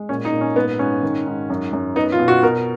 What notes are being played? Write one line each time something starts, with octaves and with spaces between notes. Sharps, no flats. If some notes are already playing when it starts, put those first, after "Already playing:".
Already playing: G#3
A#2 C#4
D#4
A#2
C#4
G#2 B3
G#2 C#4
D#3
G#2
F#2
F#2
B3 D#4
F4
B2
F#4
B2 A#4